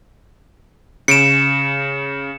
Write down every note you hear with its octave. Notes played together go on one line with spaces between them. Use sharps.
C#3 C#7 D7 E7